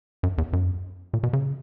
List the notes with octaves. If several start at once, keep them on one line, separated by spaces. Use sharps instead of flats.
F#2
E2
F#2
A#2
B2
C#3